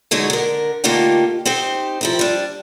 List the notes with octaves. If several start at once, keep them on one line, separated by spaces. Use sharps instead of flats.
D3 F#3 G#3 D#4 C#5
D3 A#4
D3 A3 A#3 D#4 F4 G4
C4 D#4 G4 C5
F3 E4 A#4
G3 D4